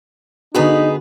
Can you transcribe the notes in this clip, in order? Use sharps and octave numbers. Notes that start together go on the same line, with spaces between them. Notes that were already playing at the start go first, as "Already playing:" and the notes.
D3 B3 D#4 F#4 G#4 B4